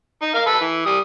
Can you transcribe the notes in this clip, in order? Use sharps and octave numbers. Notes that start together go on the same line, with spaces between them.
D#4
A#4 F5
A4 B4 B5
E3
G3 D#6